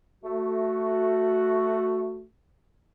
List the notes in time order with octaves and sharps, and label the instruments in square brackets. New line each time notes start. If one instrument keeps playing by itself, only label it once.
[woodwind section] A3 F#4